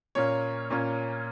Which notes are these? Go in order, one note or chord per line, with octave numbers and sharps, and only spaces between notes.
A#2 A#3 C#4 C#5
A#2 A#3 C#4